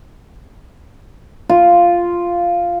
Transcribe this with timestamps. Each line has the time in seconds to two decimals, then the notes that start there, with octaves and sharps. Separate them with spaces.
1.49 F4